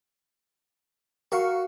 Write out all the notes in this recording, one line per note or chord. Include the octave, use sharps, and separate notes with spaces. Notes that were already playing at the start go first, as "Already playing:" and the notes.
F#4 A#4 F5 C#6